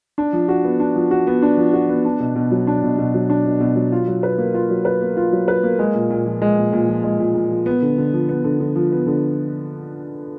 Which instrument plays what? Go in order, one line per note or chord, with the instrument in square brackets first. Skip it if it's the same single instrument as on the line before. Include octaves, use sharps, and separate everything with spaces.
[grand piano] D4
F3
F#4
B3
D4
F3
F#4
B3
D4
F3
F#4
B3
D4
B2
B2
F#3
D4
B2
B2
F#3
D4
B2
B2
F#3
F4
F#3
B4
A#3
F4
F#3
B4
A#3
F4
F#3
B4
A#3
G#3
A#2
A#2
F3
G#3
A#2
A#2
F3
G#3
A#2
A#2
F3
B3
D3
D3
F3
B3
D3
D3
F3
B3
D3